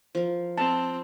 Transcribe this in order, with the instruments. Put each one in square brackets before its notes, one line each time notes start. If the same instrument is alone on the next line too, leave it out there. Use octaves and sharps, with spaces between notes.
[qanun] F3 A#4
[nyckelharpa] C4 [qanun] F4 [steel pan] A5